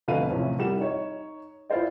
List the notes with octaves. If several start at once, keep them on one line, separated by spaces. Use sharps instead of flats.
F1 D2 B2 B4 F5 D#7
E2 A2 C3 F3 C#4
C2 G3 G4 F#5 E7
D#4 C#5
E4 F4 B4 C5 D5